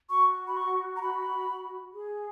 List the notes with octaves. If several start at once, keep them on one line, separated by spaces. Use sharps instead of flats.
F#4 C#6
B5
C#6
A#5
B5
G#4